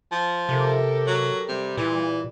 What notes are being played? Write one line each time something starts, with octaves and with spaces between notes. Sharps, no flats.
F3
C3 G4 A4 A#4
F#3
C3 G3
A#2 E3